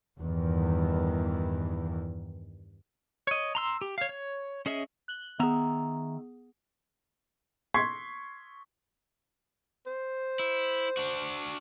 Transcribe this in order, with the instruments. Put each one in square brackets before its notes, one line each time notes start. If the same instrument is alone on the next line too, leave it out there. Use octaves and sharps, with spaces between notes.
[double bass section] E2 G2 D#3 E3
[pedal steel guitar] C#5 D#5
A#5 C6 E6
G4
C#5 F5
C#5
C#4 G#4 D#5 E5
[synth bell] F#6 F#7 G7
[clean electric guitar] D#3 E5 A#5 [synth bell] B3 G#4
[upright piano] C6 C#6 G#6 B6 C7
[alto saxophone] C5
[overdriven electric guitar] E4
D4 F#4